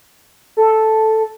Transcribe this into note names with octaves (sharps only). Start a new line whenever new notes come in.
A4